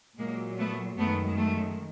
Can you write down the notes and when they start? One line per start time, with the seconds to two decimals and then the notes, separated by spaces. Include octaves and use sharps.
0.18 A#2 F#3 G#3 A#3
0.58 A3 B3
0.97 F#2 D#3 G#3 A3 B3
1.37 A3